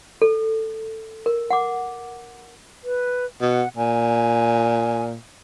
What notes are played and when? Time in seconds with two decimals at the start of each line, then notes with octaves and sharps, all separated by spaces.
0.22 A4
1.26 A#4
1.51 F#5 D6
2.84 B4
3.41 B2 F#5
3.77 A#2 G#5